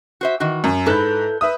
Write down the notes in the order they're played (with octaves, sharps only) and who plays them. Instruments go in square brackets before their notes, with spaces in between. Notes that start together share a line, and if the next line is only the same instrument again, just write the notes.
[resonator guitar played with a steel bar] F#4 C5 E5
D#3 E3 F#4
[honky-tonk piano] F#2
[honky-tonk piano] G#2 F#6 G6 [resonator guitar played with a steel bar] E4 A4 B4
[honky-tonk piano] B4 E5 D#6